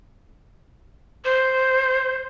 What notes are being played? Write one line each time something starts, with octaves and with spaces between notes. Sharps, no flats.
C5